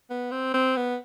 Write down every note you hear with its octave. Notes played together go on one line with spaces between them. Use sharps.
B3
C4
C4
B3